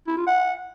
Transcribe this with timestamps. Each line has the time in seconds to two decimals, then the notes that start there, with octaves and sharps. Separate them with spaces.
0.08 E4
0.17 F4
0.27 F#5